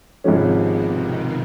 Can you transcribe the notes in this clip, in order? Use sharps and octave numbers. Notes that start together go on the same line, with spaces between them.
G#1 G#2 C3 F3 G#3 C#4
B2
D#3